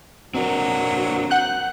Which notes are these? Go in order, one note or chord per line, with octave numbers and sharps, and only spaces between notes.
F#3 C4 D4 A#4
F#5 F#6 G6